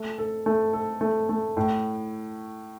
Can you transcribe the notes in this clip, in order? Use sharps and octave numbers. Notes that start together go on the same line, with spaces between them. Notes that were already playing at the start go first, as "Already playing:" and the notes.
Already playing: A3
A4
A3
A4
A3
A3
A2